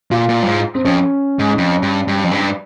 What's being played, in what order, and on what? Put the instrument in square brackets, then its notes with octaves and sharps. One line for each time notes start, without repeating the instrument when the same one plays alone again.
[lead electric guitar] A#2 [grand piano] F4
[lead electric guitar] A#2
G2
G#2
[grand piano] C4
[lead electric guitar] F2 [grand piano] C#4
[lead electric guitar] G#2
F2
G2
G2
F2
G2